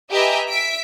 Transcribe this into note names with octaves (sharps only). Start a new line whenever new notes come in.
G4 B4 D#5 E5 G#5 A#5
E5 B6 D7